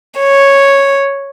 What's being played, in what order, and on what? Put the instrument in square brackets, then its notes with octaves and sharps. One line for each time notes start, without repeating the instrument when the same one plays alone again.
[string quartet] C#5